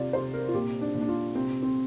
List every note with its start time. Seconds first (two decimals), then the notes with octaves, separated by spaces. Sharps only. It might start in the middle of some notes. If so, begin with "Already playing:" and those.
Already playing: C3 F4 D5
0.13 C3 C5
0.34 A#4
0.48 F4
0.54 A#2 G4
0.81 D4
0.95 A#2
1.01 D4
1.08 F4
1.35 C3 C4
1.63 C4